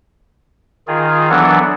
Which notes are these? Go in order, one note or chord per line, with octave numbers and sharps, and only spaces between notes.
D#3 F4 G#4
E3 F#3 B3 D4 A4